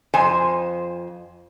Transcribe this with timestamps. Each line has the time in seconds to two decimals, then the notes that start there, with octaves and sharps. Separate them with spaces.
0.14 F2 C5 G#5